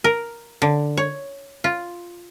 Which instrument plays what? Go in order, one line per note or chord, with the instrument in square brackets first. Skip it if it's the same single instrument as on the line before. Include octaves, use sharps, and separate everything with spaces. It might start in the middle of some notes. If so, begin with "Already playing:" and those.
[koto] A#4
D3
C#5
F4